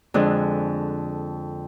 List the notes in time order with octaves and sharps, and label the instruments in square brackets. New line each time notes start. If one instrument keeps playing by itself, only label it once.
[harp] F2 D3 G#3 D4 G#4 F#6